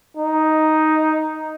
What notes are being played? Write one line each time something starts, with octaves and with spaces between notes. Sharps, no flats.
D#4